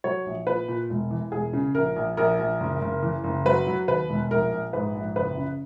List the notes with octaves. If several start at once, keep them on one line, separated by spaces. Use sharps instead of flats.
F#3 C#5
A#1
A#2 B4
A#2
E1
E3
E1 G#4
C#3
A#1 A#4
A#1
A#1 A#4
A#1
F#1
F#1
E3
F#1
F#3 B4
F#3
D#2 B4
E1
A#1 A#4
A#1
G#2 B4
A#1
F#1 B4
C#3